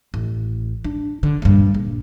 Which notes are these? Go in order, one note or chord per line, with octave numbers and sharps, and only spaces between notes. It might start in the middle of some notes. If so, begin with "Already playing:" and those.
A1
D4
D3
A#1 G2
A#1